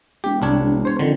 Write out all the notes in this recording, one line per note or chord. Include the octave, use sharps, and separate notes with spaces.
E1 G4
C2 D4 C#5
E1
C5 C#5
F2 D3 D#3